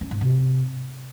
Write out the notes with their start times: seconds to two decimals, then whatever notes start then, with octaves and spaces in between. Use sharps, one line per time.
0.01 C#4
0.11 G#2
0.21 C3